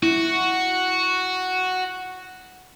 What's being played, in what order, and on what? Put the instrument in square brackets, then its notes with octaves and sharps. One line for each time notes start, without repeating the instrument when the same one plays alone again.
[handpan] E4 [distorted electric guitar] F#4